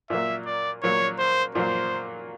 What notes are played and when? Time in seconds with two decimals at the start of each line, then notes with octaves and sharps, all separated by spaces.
0.10 A#2 F#3 A#3 E5
0.46 D5
0.83 A#2 F#3 A#3 C#5
1.19 C5
1.55 A#2 F#3 A#3 C5